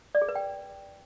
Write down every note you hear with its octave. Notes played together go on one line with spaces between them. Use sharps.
D5
G#4
B4
G5